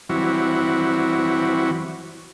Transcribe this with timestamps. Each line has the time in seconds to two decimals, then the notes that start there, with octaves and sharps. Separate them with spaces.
0.09 E3 F#3 G3 C4 E4 F#4